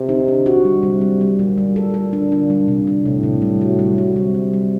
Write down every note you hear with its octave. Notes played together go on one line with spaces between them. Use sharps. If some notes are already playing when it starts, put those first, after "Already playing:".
Already playing: C3
D#4
D4
F#4
G3
C3 G3
G3
G3
A#2 G3
G3
A4
A4
D4
D4
G3
C3
D4
A2 C3
C3
G3
F#4
G3
F#4
C3 G3
G3
G3